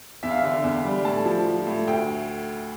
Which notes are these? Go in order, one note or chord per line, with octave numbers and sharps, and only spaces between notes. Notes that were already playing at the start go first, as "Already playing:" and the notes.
E2 E5
F5
D3 E5
E2
G3
A2 A5
F3
F3
A2
D2 G5